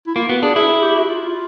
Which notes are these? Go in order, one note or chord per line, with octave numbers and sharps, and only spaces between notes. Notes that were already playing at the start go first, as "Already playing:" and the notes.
E4
A#3 F4
B3 F#4
D4 G#4
E4 G#4
G#4
G4
F#4
F4
F4